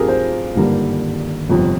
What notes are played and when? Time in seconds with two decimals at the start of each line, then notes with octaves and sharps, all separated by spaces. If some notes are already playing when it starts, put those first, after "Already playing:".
Already playing: G2 F3 C4 F4 G4 G#4 A#4
0.08 C5
0.56 G#1 G2 D3 G3 A#3
1.49 G1 F2 C3